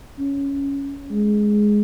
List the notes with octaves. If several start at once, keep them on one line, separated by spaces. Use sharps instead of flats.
C#4
G#3